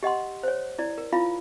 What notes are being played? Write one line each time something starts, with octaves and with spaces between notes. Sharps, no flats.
G4 D#5 F#5 C6
C5 C#5
E4 D5
A#4
E4 F4 F5 B5